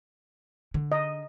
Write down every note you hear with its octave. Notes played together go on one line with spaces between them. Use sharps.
D3
D#5